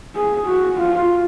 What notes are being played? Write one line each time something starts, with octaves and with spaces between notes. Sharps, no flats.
G#4
F#4
F4